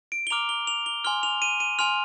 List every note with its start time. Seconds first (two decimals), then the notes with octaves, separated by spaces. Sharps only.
0.12 D7
0.27 G7
0.30 A#5 D6 F6 F7
0.49 G7
0.67 F7
0.86 G7
1.04 G#5 C6 F6 G7
1.23 F7
1.42 D#7
1.60 D#7
1.79 G#5 C6 F6 F7